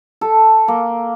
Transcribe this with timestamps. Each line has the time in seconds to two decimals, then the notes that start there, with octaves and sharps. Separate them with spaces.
0.21 A4
0.68 A#3